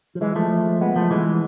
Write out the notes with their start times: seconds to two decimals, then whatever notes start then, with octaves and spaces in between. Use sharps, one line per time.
0.15 F3
0.21 E3 G#3
0.36 F3 A3
0.81 G#3 B3
0.96 F3 A3
1.11 E3 G#3